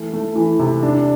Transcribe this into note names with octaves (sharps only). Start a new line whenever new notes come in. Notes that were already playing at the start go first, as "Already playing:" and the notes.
Already playing: E3 A3
A3
E3
C3
D4